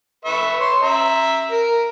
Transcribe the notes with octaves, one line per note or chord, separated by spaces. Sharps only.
B4 E5 C#6
C#5 C6
E5 A#5
A#4